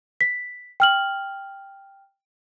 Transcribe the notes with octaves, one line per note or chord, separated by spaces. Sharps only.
B6
G5 F6 F#7